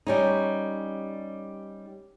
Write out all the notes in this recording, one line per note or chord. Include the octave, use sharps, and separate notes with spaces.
G3 C#4 D#4